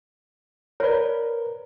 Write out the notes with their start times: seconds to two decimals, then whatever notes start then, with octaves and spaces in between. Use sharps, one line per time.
0.80 A#4 B4 C#5 D5